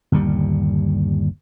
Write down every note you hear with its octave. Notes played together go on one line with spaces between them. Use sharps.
G1 D#2 A#2 G3